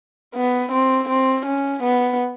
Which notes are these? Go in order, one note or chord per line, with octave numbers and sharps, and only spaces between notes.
B3
C4
C4
C#4
B3